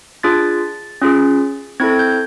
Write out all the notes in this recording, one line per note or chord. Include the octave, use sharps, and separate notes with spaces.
D4 F4 G#4 A6
C#4 F4 G#4
C4 E4 A4 G#6
G6